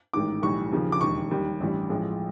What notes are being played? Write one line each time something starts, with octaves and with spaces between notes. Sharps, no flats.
A1 G#2 D#3 D6
B1 A2 E3 G3 C#6
D#2 C#3 F3
D6
E1 D#2 D#3 C#6
D#2 D#3 G3
A1 G2 E3 G3
A1 A2 F3 G#3